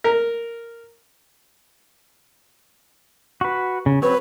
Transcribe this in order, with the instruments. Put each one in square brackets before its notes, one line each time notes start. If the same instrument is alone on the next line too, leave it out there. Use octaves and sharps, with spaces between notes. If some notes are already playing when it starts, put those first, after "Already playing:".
[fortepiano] A#4
[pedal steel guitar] F#4 B4
C#3
[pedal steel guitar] F#3 C4 C#5 [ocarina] B4